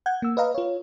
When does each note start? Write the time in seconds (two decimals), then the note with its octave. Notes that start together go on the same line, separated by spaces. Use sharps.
0.06 F#5 G6 G#6
0.22 A#3 E6
0.37 B4 D#5 F5 A#5
0.54 F4 C#5